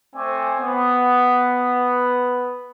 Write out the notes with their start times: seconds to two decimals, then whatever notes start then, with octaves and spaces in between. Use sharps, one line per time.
0.16 A3 C4 C5 D5 G#5
0.61 B3